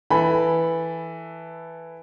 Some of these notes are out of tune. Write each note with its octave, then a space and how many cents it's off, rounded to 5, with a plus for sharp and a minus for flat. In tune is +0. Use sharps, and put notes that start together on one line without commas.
E3 +0 A4 +0 B5 +0